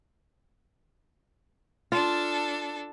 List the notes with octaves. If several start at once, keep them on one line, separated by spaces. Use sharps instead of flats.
D4 F4 A4